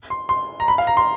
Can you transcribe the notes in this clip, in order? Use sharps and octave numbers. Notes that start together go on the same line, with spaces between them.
C6
C6
A#5
B5
F5
A#5
C6